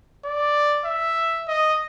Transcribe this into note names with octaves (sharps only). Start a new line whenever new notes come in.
D5
E5
D#5